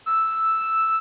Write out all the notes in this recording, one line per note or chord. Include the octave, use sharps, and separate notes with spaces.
E6